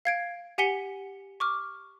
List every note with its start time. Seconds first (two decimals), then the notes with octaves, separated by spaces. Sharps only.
0.05 F5 G#6 D7
0.58 G4 F#5 G#5 B6 C#7 G7
1.40 C#6 D6 F6